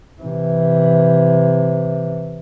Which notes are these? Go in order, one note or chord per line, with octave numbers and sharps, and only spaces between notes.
C3 E3